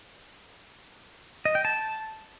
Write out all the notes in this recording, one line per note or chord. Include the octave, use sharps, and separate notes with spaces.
D#5
G5
A5